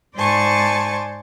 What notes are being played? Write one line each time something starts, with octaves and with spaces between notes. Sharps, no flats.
G#2 C5 D5 G#5 A5 C#6